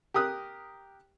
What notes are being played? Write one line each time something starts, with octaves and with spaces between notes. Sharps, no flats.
G4 A#4 D#6 F#6